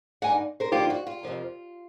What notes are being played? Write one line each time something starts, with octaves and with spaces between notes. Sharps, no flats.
G2 D3 F3 A#3 D#4 F#5 G#5
A#4 C5
G2 D3 F3 A#3 D#4 F4 G4
F#4
F4
F2 C3 F3 A#3